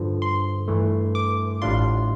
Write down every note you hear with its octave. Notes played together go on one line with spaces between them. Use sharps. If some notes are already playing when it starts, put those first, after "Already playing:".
Already playing: G2 D3 F3
C6
G2 E3 A3
D6
A1 A2 G3 D4 F4 C6